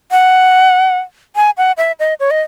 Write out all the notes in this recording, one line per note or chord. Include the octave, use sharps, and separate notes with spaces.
F#5
G#5
F#5
E5
D#5
C#5
D#5